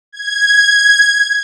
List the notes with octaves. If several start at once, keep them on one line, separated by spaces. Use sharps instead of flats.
G#6